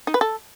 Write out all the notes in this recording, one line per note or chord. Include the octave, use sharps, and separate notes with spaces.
D#4
B4
A4